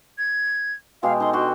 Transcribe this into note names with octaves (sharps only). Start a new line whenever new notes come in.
G#6
B2 G#3 G4 F5
D#4 A4 C6
D4 F#4 G4 C6